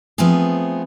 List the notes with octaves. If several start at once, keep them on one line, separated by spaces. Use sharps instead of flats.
F3 A3 B3 C4 G#4